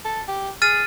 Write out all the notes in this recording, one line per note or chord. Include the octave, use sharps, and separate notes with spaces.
A4
G4
G#4 F6 A6 D#7